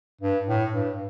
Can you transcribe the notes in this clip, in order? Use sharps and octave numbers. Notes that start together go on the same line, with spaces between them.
G2
A2
G2